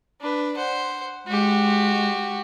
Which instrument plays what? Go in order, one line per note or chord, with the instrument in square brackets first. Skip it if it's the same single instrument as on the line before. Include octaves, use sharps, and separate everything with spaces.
[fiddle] D4 B4
C5 F#5
[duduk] G#3 [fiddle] F#4 G4